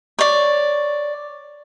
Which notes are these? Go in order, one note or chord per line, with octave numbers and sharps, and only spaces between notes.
C#5 D5